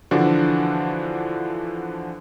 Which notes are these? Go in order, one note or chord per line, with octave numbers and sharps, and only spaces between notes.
D3 E3 F3 D4 F#4